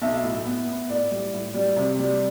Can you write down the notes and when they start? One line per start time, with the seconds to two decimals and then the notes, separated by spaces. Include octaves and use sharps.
0.02 B1 E5
0.23 A2
0.45 B3
0.67 B3
0.89 A2 D5
1.11 G3
1.33 A2
1.54 G3
1.76 C3
1.99 G3